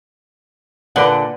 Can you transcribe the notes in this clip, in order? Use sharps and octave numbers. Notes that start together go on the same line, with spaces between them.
A#2 D3 B4 D5 F#5